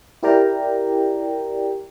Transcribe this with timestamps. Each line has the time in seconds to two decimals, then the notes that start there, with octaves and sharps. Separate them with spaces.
0.23 E4 G4 A#4 D5 G5 A#5